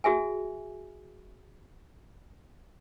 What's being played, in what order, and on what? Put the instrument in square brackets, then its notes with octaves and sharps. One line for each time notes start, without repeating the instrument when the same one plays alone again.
[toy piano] F#4 G#4 E5 G#5